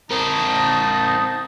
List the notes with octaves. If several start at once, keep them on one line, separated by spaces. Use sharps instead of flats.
C4 D#4 A#4 A5